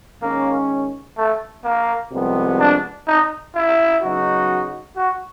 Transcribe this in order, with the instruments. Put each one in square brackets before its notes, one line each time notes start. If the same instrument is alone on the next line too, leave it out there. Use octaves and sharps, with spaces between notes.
[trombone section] D#3 G#3 C#4 [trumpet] A#3
[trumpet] A3
A#3
[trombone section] C2 C3 F3 G#3 B3
[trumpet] D4
D#4
E4
[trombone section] C#3 F#3 B3 D#4 F#4
[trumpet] F#4